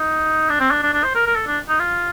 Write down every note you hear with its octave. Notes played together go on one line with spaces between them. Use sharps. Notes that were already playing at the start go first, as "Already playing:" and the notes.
Already playing: D#4
D4
C4
D4
D4
D4
C5
A#4
A#4
A4
D4
D#4
F4